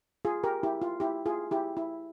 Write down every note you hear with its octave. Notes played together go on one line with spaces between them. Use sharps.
F4 G#4
G4 A#4
E4 G4
F4
E4 G4
F4 G#4
E4 G4
E4